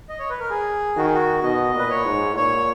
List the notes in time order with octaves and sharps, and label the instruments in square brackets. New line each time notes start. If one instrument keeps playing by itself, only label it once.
[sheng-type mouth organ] D#5
C#5
B4
A#4
G#4
[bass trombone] D#3 [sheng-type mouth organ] F#4
[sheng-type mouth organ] G#4
F#4
[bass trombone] B2 [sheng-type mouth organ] D#5
[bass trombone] A#2 [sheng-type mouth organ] B4
[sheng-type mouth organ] C#5
[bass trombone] G#2
[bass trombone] A#2 [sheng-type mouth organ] C#5